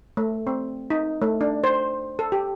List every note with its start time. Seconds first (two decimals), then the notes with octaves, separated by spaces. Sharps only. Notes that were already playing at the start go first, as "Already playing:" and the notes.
0.17 A3
0.47 C4
0.90 D#4
1.22 A3
1.41 D4
1.64 C5
2.19 A4
2.32 G4